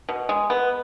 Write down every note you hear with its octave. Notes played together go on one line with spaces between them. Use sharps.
B2
G#3
B3